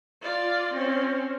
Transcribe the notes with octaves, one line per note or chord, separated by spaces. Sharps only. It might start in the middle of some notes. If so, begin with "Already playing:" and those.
F4 D5
C4 C#4